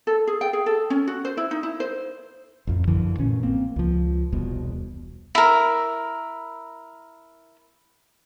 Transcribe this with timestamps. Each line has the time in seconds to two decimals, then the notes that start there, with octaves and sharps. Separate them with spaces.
0.07 A4
0.27 G#4
0.41 G5
0.53 G#4
0.66 A4
0.90 C#4
1.07 F#4
1.25 C5
1.37 E4
1.51 D#4
1.63 E4
1.80 C5
2.67 A1 F2
2.87 F#2 D3 E3 F3
3.18 A1 A#2 C#4
3.43 A#3 C4
3.76 C#2 F3
4.32 E1 C2 B2
5.35 E4 A#4